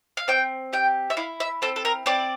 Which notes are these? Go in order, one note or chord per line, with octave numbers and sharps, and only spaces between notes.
F5
C4 G5
G4 G5
E5
E4 F5
E5
C4 A4
A4
A#4
C4 D5